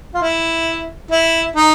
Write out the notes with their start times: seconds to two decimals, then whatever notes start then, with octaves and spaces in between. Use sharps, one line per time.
0.14 F4
0.22 E4
1.11 E4
1.56 D#4